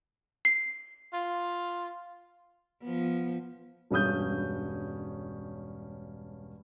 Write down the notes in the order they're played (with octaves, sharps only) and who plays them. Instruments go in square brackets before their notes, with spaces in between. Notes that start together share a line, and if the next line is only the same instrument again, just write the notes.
[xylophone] C7
[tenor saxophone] F4
[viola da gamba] F3 B3
[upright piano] E1 G2 C#4 D#6 G6